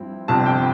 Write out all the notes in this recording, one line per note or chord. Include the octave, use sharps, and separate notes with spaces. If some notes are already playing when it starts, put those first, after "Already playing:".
Already playing: G2 F3 C4 E4
G1 F2 C3 A5
G5